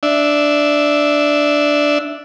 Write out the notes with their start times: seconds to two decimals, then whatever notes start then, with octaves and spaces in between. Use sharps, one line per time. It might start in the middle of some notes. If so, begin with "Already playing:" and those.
0.03 D4 E5